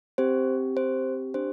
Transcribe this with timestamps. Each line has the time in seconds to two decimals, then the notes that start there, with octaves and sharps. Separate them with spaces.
0.18 C4 G4 C5
0.77 C5
1.34 D4 G4 C5